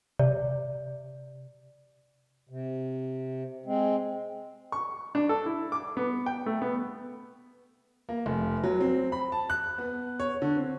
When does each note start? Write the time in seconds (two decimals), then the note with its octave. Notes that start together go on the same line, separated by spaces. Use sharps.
0.19 C3 D5
2.49 C3
3.66 G#3 C4
4.72 C#6
5.15 D4
5.29 A4
5.46 E4
5.72 D6
5.97 B3
6.26 G5
6.46 A3
6.62 B3
8.09 A#3
8.26 F1
8.64 F#3
8.81 C4
9.12 B5
9.32 A5
9.50 F#6
9.78 B3
10.20 C#5
10.42 D3
10.57 C4